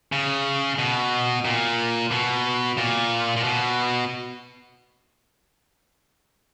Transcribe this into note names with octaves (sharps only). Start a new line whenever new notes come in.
C#3
B2
A#2
B2
A#2
A#2
B2